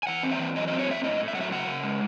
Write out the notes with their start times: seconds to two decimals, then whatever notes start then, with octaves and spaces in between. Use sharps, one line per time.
0.03 G#5
0.07 E3 F#5
0.23 C4
0.31 E5
0.39 E3
0.56 F#3 D#5
0.67 D#5
0.72 C4
0.79 C#5
0.88 A2 E5
1.04 A2 D#5
1.20 A2
1.28 E5
1.35 F#3 F#5
1.41 E5
1.52 C#3 F#5
1.67 C#3
1.83 G#3